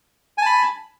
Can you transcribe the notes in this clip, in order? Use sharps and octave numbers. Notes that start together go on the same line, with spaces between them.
G#5 A5 B5